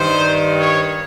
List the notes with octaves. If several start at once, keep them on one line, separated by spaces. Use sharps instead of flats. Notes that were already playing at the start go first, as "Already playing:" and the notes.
Already playing: G2 D#3 C5
C#5